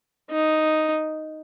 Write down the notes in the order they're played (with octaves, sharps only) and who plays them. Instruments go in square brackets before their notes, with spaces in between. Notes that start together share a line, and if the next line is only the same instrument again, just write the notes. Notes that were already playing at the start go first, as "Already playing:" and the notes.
[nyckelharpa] D#4